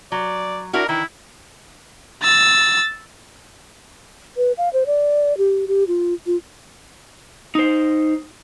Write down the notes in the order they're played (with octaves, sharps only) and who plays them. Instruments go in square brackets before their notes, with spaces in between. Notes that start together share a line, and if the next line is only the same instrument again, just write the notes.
[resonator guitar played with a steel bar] F#3 [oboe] D5
[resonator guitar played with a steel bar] D4 E4 F#4 [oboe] A#4
[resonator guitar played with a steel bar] D#3 E3 [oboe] E4
[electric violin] E6 A6
[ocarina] B4
F5
C5
D5
G4
G4
F4
F4
[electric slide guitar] D#4 C5